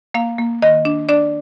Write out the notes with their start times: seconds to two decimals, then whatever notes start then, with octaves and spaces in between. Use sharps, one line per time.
0.14 A#3 F5
0.38 A#3
0.62 D#3 D#5
0.85 D4
1.09 D4 D5